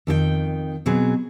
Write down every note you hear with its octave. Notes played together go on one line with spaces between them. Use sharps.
F2 D#3 F#4 G5
B2 F#3 C4 G#4